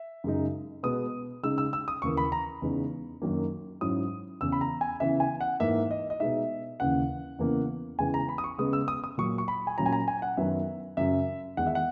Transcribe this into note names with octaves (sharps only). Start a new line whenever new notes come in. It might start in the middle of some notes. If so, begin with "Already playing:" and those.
Already playing: E5
F#2 C#3 G#3 D#4
B2 G#3 B3 D#6
C#3 G#3 D#4 E6
E6
E6
D#6
D#2 C#3 E3 A#3 C#6
B5
A#5
E2 C#3 G#3 B3 D#4
F#2 D#3 F#3 A#3
G#2 F#3 C#4 E4 D#6
E2 C#3 E3 E6
B5
A#5
G#5
C#3 E3 B3 E5
G#5
F#5
G#2 E3 A#3 D#4 E5
D#5
D#5
B2 G#3 D#4 E5
D#2 C#3 E3 F#5
E2 C#3 E3 A#3
E2 C#3 E3 G#3 G#5
A#5
B5
D#6
C#6
C#3 G#3 B3 D#6
E6
D#6
D#6
A#2 F#3 A#3 C#6
C#6
B5
G#5
A#2 F#3 C#4 A#5
G#5
A#5
G#5
F#5
F#2 D#3 F#3 B3 E5
F#2 C#3 F#3 E5
E2 D#3 G#3 D#4 F#5
E5
F#5